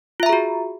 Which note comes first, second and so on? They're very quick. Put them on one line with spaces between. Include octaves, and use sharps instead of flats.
F4 E5 A#5 G#4 F#4